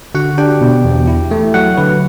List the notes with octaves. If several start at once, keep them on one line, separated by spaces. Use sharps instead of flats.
D3 F#4 F#5
D4 G4 G5
B2
E2
E4
A3
F#3 F#4 F#5
D3 B4